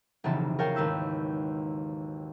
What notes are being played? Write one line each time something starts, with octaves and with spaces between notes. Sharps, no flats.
F1 B1 C#3 E3 C4 A5
G#4 A#4 C#5 F5 G5 A5
G#1 D#2 B4 E6 G6